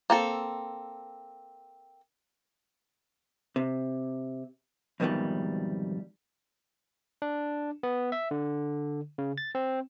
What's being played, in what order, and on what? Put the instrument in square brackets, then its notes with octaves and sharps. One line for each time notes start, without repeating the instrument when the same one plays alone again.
[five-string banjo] A#3 C4 A4
[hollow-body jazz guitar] C3
F2 G#2 B2 D#3 E3 G3
[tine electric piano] D4
B3
E5
D3
C#3
A6
C4